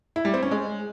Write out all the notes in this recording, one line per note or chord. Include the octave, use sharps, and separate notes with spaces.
E4
G3
C4
C#4
G#3